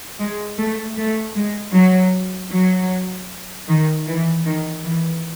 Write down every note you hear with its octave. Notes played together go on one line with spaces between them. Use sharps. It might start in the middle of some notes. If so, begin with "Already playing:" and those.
G#3
A3
A3
G#3
F#3
F#3
D#3
E3
D#3
E3